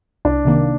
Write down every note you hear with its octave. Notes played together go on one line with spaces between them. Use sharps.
C2 D4
C3 D#3 A#3